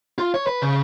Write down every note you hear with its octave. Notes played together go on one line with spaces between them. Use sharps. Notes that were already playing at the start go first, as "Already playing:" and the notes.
F4
C#5
B4
C#3